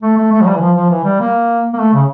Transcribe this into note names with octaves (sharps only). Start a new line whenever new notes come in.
A3
A3
A3
F3
G3
E3
F3
F3
E3
G3
A#3
A#3
A3
C#3